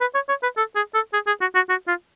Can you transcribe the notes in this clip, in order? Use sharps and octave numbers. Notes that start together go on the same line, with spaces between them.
B4
C#5
C#5
B4
A4
G#4
A4
G#4
G#4
F#4
F#4
F#4
F4